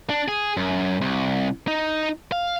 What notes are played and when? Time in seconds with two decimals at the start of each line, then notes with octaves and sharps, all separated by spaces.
0.09 D4
0.28 G#4
0.57 F#2
1.01 C2
1.68 D#4
2.32 F5